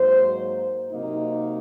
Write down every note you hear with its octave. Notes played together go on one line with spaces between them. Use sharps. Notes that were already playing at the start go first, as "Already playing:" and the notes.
Already playing: G#2 F#3 A#3 C5
C3 F#3 A#3 D#4